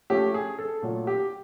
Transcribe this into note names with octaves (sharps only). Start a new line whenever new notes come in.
F3 A3 C#4 G4
G#4
A4
A#2 F#3 A3
G4